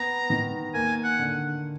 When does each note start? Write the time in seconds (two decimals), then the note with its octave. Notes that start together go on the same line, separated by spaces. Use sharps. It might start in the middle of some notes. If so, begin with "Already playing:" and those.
Already playing: B3 A#5
0.30 D#3
0.74 A#3 G#5
1.04 F#5
1.19 D3